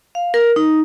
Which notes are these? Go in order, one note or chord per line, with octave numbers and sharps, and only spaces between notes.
F5
A#4
D#4